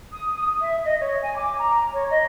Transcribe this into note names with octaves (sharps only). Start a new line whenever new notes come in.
D#6
E5
D#5
C#5
G#5
D6
A#5
C#5
D#5